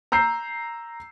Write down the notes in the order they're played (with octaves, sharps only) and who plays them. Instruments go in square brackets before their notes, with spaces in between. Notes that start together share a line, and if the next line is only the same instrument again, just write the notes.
[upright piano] A#5 E6 G6 C7